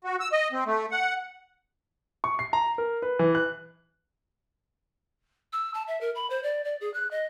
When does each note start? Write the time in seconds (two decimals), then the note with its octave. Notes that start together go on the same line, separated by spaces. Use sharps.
0.04 F#4
0.20 E6
0.32 D#5
0.52 C4
0.66 A3
0.92 F#5
2.24 C#6
2.39 C7
2.53 A#5
2.78 A#4
3.02 B4
3.19 E3
3.35 F#6
5.53 E6
5.74 A5
5.87 E5
6.01 A#4
6.15 B5
6.30 C5
6.43 D5
6.65 D5
6.81 G#4
6.94 F#6
7.11 D#5